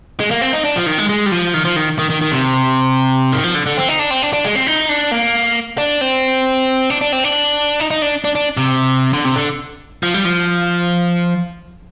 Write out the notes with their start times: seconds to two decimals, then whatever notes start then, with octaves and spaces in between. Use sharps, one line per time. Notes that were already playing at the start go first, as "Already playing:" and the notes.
0.20 G#3
0.31 A#3
0.42 C4
0.53 D#4
0.65 D4
0.76 F3
0.86 D#3
0.98 G#3
1.09 G#3
1.26 G3
1.32 F3
1.54 D#3
1.65 F3
1.76 D#3
1.99 D#3
2.10 D#3
2.21 D#3
2.32 C3
3.32 D#3
3.44 F3
3.55 D3
3.66 D3
3.77 C4
3.89 D#4
3.99 D4
4.11 C4
4.22 D4
4.33 D4
4.45 G#3
4.55 C4
4.67 D#4
4.89 D4
5.11 A#3
5.78 D4
6.01 C4
6.90 D4
7.01 D4
7.13 C4
7.24 D4
7.80 D#4
7.91 D#4
8.02 D4
8.24 D4
8.35 D4
8.57 C3
9.13 D3
9.25 C3
9.36 D3
10.03 F3
10.14 G3
10.25 F3